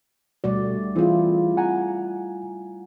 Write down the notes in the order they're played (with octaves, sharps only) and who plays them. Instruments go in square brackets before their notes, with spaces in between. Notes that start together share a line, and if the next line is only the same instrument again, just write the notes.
[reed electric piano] D2 B2 F#4 [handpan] G3 A3 D5
[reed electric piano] E3 C4 G#4 [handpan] E4 F4
[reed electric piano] F#5 G#5 A#5